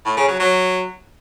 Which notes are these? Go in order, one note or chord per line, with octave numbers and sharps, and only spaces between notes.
A2
C#3
F#3
F#3